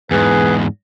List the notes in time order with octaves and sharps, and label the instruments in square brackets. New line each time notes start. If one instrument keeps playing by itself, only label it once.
[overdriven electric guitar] E2 G#2 [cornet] G#4 [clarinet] B4